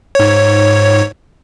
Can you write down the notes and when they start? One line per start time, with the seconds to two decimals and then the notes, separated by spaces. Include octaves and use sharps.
0.15 G#2 C#5